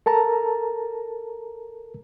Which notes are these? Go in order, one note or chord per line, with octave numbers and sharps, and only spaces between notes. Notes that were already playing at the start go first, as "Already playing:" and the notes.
A4 A#4 A5 A#5